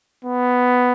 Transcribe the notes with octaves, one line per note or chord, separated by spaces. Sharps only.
B3